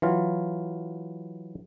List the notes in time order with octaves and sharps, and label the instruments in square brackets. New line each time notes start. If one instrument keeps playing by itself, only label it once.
[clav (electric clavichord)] E3 F#3 F4